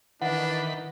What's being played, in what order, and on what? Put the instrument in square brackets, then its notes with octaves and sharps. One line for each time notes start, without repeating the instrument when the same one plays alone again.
[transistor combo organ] D#3 B5 [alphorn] E3 [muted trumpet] D4 [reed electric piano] F#5